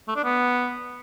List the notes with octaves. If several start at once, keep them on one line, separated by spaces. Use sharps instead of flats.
A3
D4
B3